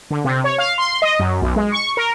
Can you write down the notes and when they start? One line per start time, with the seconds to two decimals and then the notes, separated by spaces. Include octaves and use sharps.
0.10 D3
0.24 C3
0.44 C#5
0.58 F5
0.78 C6
1.02 D#5
1.19 F#2
1.42 B1
1.56 G#3
1.72 C#6
1.97 A#4